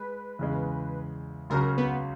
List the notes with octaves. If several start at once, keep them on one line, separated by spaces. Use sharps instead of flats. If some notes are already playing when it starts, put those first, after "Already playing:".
Already playing: G#3 B4
E2 C#3 G#3
C#2 C#3 F#3 A#4
B3